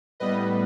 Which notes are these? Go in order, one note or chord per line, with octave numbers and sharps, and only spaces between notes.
A2 G3 B3 B4 D#5